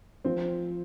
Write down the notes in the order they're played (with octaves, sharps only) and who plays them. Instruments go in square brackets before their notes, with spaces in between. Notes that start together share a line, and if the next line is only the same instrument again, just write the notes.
[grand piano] F3 [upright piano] C4